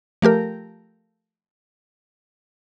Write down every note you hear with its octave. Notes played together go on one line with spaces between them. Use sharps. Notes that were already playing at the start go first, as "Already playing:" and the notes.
F3 A3 G4 A#4